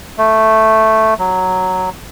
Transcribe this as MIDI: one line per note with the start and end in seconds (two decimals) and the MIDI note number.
0.18 1.14 57
1.19 1.89 54